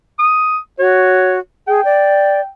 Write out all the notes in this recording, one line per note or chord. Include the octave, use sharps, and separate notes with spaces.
D#6
F#4 C#5
G#4 G5
D5